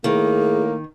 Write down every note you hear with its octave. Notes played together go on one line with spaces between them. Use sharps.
A2 D#3 A#3 G#4